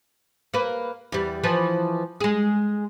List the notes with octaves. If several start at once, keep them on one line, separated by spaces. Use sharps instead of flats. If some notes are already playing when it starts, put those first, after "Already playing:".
A#3 B4
E2 G3
E3 F3 B4
G#3 G#4